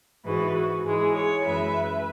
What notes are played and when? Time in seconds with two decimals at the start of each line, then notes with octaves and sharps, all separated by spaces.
0.24 G#2 E3 G#3 F#4 B4
0.54 F#4
0.83 G#2 E3 G#3 G#4
1.13 G#4 C#5
1.43 F#2 E3 G#3 B4 E5